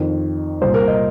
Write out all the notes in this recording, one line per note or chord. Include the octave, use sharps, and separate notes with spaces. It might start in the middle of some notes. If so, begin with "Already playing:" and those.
Already playing: F2 D#3
C2 A#2 C5
A#4
D#5